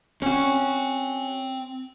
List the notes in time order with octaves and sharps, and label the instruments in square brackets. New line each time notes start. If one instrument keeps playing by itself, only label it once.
[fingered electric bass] C4 [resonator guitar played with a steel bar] C#4 F#4